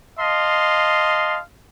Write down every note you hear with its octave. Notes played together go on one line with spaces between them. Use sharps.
D#5 F5 A5 C6